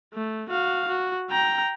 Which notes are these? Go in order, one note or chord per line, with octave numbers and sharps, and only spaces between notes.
A3
F#4 F5
F#4
G5 A#5